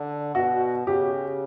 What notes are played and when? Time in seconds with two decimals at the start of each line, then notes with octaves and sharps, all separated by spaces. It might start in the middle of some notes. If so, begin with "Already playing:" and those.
Already playing: D3
0.35 B2 F#4
0.87 C#3 G4